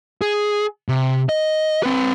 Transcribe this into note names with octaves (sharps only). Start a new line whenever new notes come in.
G#4
C3
D#5
C4 B4